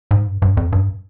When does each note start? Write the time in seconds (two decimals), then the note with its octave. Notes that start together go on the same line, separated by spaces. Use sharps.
0.11 G#2
0.27 G2
0.42 G2
0.57 F2
0.72 G2